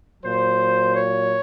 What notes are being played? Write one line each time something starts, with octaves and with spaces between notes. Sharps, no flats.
A#2 F#3 C5
C#5